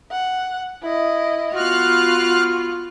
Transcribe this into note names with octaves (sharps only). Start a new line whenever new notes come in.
F#5
E4 D#5
B3 F4 F#4 F5 F6 F#6